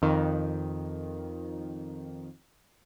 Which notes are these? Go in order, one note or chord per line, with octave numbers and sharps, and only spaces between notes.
F2 D#3